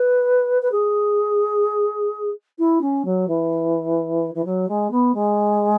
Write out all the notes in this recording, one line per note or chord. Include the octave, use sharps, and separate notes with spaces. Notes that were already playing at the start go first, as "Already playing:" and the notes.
Already playing: B4
B4
G#4
E4
C#4
F#3
E3
E3
F#3
G#3
B3
G#3